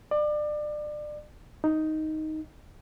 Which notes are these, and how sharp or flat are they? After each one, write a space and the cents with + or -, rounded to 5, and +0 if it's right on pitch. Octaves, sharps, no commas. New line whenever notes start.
D5 +30
D#4 +5